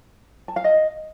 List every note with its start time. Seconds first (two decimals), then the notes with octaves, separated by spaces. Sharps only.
0.48 A5
0.56 F5
0.64 D#5